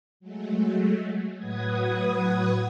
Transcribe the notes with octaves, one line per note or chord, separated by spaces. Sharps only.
F#3 G#3 A3
A2 F#3 B4 F#5 D#6 G#6